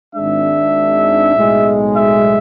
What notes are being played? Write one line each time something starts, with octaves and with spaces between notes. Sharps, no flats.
G#1 G#2 G#3 D4 E5
B1 A2 G#3
E5